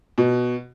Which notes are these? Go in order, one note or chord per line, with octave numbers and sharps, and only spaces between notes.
B2